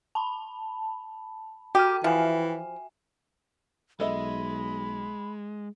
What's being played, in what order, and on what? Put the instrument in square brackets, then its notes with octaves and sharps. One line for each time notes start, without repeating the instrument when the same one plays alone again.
[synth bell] A5 B5
[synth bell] F#4 G5 F6 [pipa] G4
[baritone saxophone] E3 [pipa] F3 [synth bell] E5 G#5
[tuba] B1 [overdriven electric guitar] G#3 [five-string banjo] A4 D#5 E5 [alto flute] B5